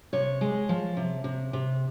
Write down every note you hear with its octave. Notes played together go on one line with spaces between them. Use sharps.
C3 C#5
G#3
F3
C3
C3
C3